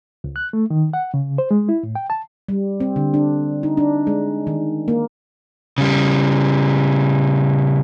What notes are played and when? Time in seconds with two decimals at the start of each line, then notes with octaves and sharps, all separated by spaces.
0.24 C#2
0.36 F#6
0.53 A3
0.70 D#3
0.93 F#5
1.14 C#3
1.38 C5
1.51 G#3
1.69 E4
1.83 A2
1.95 G5
2.10 A5
2.49 G3
2.80 C4
2.96 D3
3.14 D4
3.63 D#4
3.77 D4
4.07 G#3
4.47 D#3
4.88 A#3
5.78 C#3 G3